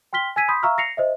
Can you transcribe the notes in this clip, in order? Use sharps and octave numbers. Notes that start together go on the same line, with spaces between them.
G5 C6 F6 B6 G7
G#5 E6 G#6 B6 D#7
B5 C6 D#6 G6 B6
E5 F5 A#5 C#6 E6 F6
A#6 C7 C#7 F7
C5 D#5 E5